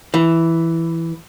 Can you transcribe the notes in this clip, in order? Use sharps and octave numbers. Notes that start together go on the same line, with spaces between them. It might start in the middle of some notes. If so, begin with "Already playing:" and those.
E3